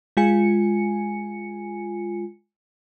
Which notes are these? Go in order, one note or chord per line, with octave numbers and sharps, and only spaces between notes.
G#3 F4 G#5 C#7